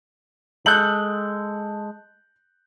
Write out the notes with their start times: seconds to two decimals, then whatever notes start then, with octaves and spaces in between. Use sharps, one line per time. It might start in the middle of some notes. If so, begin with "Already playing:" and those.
0.66 G#3 A4 F#6 G6 F#7